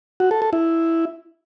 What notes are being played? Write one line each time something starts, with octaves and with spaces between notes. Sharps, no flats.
F#4
A4
A4
E4